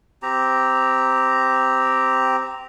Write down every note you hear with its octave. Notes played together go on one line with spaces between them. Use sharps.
C4 G4 A#5